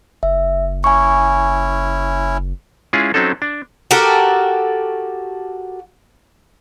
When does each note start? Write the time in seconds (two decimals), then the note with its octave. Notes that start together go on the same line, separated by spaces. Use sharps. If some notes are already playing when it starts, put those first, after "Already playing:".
0.23 F#1 E5
0.84 C#4 E4 G#5 C#6
2.93 G#3 C#4 E4 F4 G#4
3.14 F#3 C4 C#4 D#4 A4
3.42 D4
3.91 F#4 G4 A4 A#4